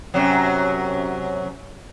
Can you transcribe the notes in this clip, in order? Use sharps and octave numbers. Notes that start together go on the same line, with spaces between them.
F#2 C3 F#3